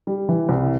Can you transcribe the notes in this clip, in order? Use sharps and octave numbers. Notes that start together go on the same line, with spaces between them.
G3
E3
C2